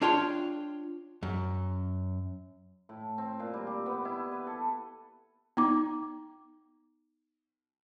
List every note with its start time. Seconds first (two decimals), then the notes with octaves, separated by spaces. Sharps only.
0.02 D4 F4 C#5 G5 C6
1.23 F#2
2.89 A2
3.18 C4
3.40 A#2
3.54 G3
3.67 G4
3.86 B3
4.05 E4
4.31 B4
4.47 A4
5.57 B3 D#4 D6